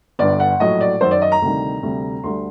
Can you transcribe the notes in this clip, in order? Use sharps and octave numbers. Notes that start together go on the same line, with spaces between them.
G1 G2 D3 D5
F#5
A#1 A2 F#3 D#5
D5
F#2 D#3 F#3 C5
D5
D#5
A#5
D2 C3 D#3 G3
D2 C3 G3
D2 D3 G3 C6